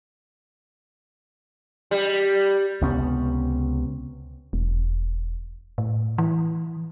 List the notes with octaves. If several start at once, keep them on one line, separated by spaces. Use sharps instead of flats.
G3
C#2 C3 B3 C#4
E1
A2
E3